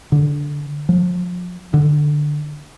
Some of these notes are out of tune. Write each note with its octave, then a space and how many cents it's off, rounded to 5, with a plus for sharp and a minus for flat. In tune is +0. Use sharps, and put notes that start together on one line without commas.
D3 -5
F3 +35
D3 +10